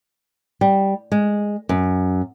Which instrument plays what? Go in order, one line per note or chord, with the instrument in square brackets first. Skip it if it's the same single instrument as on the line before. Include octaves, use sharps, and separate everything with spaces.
[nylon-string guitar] G3
G#3
F#2